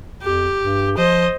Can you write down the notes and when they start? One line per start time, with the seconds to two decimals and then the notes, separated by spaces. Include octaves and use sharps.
0.23 F2 G4
0.61 G2
0.98 F3 C5 D#5